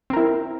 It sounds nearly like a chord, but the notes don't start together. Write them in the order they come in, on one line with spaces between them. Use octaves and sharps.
C4 A#4 E4